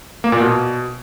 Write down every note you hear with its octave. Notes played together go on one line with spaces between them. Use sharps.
A#3
A#2
B2